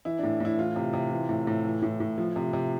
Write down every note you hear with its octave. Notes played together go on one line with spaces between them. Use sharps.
E3 E4
A2 D4
A2 E4
E3 F4
C3
C3
E3
A2
A2
E3
A2
A2
F3
C3
C3